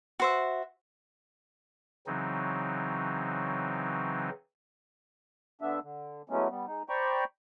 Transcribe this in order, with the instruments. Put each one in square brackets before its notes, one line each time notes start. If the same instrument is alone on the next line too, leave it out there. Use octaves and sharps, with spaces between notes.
[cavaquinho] F#4 C5 E5
[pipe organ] C#3 E3 F#3 C4 D#4
[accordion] D3 B3 D4 E5
D3
E3 F#3 G#3 A3 B3 C#4
G3 B3
G#3 D#4
C5 D5 G5 A#5 B5 C#6